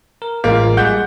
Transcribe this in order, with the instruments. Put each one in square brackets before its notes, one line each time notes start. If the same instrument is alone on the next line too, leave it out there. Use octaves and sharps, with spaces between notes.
[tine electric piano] A#4
[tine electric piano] A1 G#3 [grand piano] A#3 F4
[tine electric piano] G3 G#3 [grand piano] F#5 G6